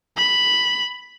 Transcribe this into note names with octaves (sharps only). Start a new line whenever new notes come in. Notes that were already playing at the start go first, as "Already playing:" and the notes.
B5